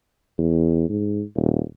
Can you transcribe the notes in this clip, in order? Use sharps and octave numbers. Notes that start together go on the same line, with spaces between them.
E2
G#2
D#1